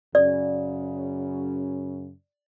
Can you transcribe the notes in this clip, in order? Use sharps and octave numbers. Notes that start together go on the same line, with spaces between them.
F#2 C#3 D5